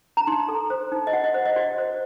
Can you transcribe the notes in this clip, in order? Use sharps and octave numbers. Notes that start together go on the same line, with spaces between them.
A#5
D#4 C6
A4
C5
D#4
D#5
F#4 F#5
D#5
C5
D#5
F#4 D5
C5